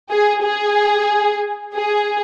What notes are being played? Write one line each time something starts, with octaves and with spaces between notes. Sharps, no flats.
G#4
G#4
G#4